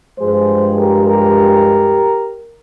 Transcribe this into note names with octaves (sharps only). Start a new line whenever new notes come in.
G2 F3 G#3 G#4 C5
G4 A#4
G4 A#4